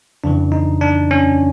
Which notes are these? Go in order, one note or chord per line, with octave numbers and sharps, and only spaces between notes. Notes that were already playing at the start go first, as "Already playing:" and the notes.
F2 C#3 E3 D4
D#4
D4
C#4